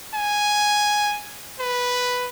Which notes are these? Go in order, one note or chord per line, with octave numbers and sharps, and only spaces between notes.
G#5
B4